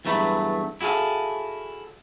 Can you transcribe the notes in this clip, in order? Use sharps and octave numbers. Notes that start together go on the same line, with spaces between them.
E2 G2 F#3 A3 E4 B5
E4 F#4 G#4 A4 F5